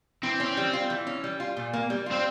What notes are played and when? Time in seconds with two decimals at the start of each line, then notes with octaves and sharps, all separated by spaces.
0.23 E3 C4
0.40 C#4
0.57 G3
0.73 F4
0.90 E3
1.07 C#4
1.24 G3
1.40 F4
1.57 A#2
1.73 A#3
1.90 G3
2.06 F4
2.12 C4